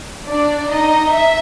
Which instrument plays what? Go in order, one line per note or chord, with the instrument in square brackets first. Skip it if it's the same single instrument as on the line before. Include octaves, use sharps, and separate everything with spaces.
[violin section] D4 D5
D#4 D#5
E5